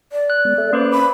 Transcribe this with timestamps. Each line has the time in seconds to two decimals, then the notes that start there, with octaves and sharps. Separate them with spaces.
0.12 D5
0.30 F#6
0.45 G#3 B3
0.58 A4 E5
0.73 A#3 C#4 B4 C5 D6
0.92 B5